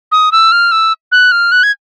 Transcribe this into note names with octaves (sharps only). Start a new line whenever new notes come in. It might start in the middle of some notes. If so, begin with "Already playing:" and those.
D#6
E6
F6
E6
F#6
F6
F#6
G#6